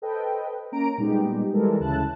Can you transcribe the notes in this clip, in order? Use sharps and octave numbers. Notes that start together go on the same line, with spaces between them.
A4 B4 C5 D#5 G5
A#3 C#4 A#5 D7
A#2 G3 G#3 B3 D#4 G4
E3 G3 G#3 A4 A#4
D2 C#3 E4 A5 F#6